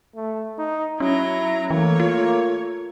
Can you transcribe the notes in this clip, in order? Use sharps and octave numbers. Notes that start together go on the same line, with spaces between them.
A3
D#4
F#3 C#4 E4 A#5
E3 A3 A#3 C#5
F4